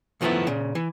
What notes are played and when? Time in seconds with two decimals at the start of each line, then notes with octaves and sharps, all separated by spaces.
0.21 F#2 D#3 F3 A3 B3 E4
0.47 A#2 C#3
0.75 E3